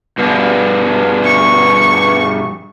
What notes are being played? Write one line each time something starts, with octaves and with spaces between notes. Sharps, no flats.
G2 B2
C#6